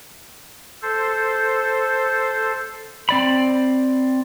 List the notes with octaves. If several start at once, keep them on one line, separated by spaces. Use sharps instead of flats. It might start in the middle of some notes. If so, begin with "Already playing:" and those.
A4 C5
C4 D5 B5